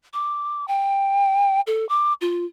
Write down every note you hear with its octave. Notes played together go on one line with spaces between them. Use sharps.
D6
G5
A4
D6
F4